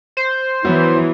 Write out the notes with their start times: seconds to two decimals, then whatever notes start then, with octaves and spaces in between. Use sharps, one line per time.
0.17 C5
0.65 E3 F#3 B3 E4